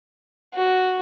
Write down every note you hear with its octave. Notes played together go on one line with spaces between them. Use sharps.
F#4